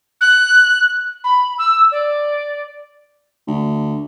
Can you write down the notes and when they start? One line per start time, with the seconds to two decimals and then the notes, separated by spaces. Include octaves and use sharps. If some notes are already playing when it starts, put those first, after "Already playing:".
0.21 F#6
1.24 B5
1.58 E6
1.91 D5
3.47 D2